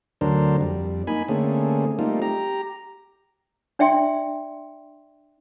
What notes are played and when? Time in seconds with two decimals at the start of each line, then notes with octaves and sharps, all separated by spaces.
0.21 D2 D3 F#3 D4 A#4 C5
0.61 F2 G3
1.07 A#3 D#4 G#5 B5
1.28 D3 A3 A#3 C4 C#4 G#4
1.99 G3 A3 A#3 C4 D#4 F4
2.22 G4 A#5
3.79 D4 D5 E5 G5 C6